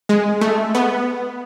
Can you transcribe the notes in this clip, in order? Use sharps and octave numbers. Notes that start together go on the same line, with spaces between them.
G#3
A3
B3